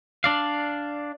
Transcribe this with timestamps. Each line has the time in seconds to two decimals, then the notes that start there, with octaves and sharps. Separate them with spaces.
0.24 D4 D5 F5